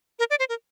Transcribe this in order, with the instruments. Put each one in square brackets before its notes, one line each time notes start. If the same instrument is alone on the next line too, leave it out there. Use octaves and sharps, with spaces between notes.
[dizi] A#4
D5
C5
A#4